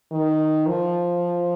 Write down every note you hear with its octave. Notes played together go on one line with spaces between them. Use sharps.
D#3
F3